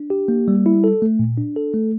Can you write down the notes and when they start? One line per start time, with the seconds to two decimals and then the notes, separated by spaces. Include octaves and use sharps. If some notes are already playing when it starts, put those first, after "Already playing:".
Already playing: D4
0.10 G4
0.28 A#3
0.48 G3
0.66 E4
0.84 A4
1.02 A3
1.19 A#2
1.37 D4
1.56 A4
1.74 A3